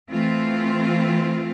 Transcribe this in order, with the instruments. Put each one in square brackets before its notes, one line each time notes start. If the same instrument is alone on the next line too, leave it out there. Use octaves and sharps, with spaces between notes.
[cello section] E3 A3 C4 F4